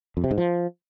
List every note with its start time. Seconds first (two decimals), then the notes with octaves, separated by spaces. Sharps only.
0.17 F2
0.24 C3
0.31 G#2
0.38 F3